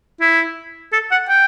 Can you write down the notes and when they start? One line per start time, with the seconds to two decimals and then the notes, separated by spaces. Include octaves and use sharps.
0.21 E4
0.92 A4
1.11 F#5
1.29 G5